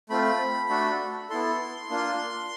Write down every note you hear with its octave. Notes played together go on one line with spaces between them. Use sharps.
A3 C4 F4 B5
A3 D4 F#4 A4
B3 E4 A4 C6
A#3 D4 F4